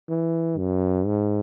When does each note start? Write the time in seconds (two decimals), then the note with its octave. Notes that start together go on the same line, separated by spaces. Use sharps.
0.09 E3
0.58 F#2
1.06 G#2